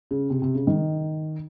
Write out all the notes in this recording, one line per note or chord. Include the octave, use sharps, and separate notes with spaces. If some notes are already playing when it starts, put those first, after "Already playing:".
C#3
C3
C3
C#3
D#3